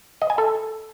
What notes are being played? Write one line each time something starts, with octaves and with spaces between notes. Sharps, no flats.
D#5
G#5
A4